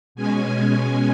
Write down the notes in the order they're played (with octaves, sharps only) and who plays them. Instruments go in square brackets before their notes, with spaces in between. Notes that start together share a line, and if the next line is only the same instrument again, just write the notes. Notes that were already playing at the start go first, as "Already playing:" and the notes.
[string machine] B2 G#3 C#4 G#5